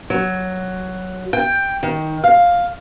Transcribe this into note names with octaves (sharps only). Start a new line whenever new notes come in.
F#3
G5
D#3
F5